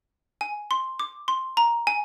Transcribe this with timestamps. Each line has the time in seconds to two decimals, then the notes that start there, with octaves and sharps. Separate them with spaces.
0.41 G#5
0.71 C6
1.00 D6
1.28 C6
1.57 A#5
1.87 G#5